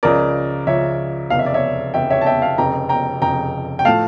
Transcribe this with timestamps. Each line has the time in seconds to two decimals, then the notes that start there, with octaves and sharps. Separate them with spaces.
0.03 C#2 C#3 F3 A#4 D5
0.67 C#2 C#3 F3 C#5 E5
1.30 F1 E2 C#3 F5
1.39 E5
1.46 D5
1.54 C#5 E5
1.94 F1 E2 C#3 E5 G5
2.10 C#5 E5
2.21 A5
2.26 E5 G5
2.42 F5 A5
2.58 F1 F2 C#3 G5 A#5
2.89 G5 A#5
3.21 F1 F2 C#3 G5 A#5
3.79 G5
3.85 A2 F3 A3 F5 A5